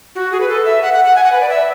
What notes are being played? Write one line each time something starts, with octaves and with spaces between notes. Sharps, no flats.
F#4
G#4
B4
A4
E5
F#5
F#5
F#5
G#5
F#5
B4
D5
E5